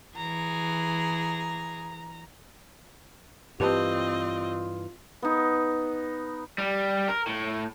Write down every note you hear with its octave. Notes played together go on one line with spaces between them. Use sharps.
E3 G#4 A#5
G2 E3 C4 F4 G4 B4 D#5 A5
B3 D#4
G3
A#4
A2